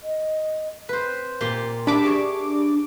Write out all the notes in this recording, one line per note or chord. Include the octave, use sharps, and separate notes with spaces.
D#5
C4 B4 C5
A#2 G4 C6
D4 G4 E5 A5 B5 D6
G#4 C#5